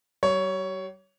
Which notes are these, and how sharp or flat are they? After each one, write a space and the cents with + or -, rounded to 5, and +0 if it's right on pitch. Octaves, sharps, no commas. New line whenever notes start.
G3 -40 C#5 +10